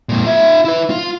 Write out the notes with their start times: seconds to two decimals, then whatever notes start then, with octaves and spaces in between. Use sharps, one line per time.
0.09 F2 A#2
0.25 F4 E5
0.65 E4 B4
0.90 F4